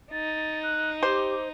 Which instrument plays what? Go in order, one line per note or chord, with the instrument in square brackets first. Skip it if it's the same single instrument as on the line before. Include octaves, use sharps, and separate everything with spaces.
[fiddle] D#4 [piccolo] A6
[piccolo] F#6
[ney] G4 [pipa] C5 [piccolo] D6